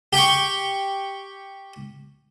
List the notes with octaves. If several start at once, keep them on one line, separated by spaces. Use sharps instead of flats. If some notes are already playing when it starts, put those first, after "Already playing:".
G4 G5 C#6